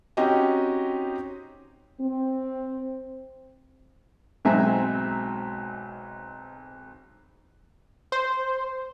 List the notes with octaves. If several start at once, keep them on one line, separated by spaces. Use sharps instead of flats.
C4 C#4 D#4 F#4 G4 D#5
C4
B1 G#2 C4 E5 G#5 A#5
C5